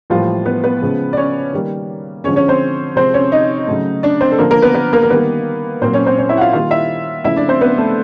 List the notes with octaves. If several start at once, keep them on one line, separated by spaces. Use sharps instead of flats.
A2 E3 F3 G3 A#3 F4
B3 B4
B3 B4
C#3 F3 G#3
D5
C#4 C#5
D#3 G3 A#3
D3 F3 G#3 C#4 C#5
C#4 C#5
C4 C5
C3 F3 G#3 C4 C5
C#4 C#5
D#4 D#5
C#3 F#3 A3
D4 D5
C4 C5
A4
D3 F3 A#3 A#4
A#3 A#4
B3 B4
B3 B4
A#3 A#4
A#4
D#3 G3 A#3 B3 B4
A#2 F#3 A#3 C4 C5
C#4 C#5
C4 C5
C#4 C#5
E4 E5
F#5
F4 F5
D#3 G3 A#3 F4 F5
E4 E5
C#3 F3 A3 E4 E5
D4 D5
C4 C5
B3 B4
A3 A4